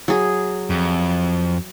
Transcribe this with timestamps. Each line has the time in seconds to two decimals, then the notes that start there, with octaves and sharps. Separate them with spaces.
0.08 F#3 G#4
0.70 F2